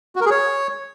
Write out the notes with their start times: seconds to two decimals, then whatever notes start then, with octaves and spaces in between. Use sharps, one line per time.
0.16 F#4
0.21 A#4
0.26 G#4
0.31 C#5